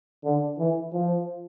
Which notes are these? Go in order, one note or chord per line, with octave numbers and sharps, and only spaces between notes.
D3
E3
F3